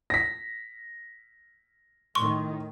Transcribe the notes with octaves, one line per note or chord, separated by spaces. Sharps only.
A#6 B6
A2 D#3 C6 C#6